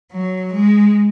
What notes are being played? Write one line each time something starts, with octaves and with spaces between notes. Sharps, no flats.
F#3
G#3